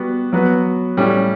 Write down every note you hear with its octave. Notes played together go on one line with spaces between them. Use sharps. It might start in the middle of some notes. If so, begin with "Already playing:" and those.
Already playing: G3 B3 F#4
F#3 B3 F#4 B4
A2 G3 C#4